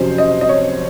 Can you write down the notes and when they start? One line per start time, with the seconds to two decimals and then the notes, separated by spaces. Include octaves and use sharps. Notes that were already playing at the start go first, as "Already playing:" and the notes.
Already playing: F2 C3 F#3 C#4 C5
0.18 D#5
0.41 D#5
0.49 C#5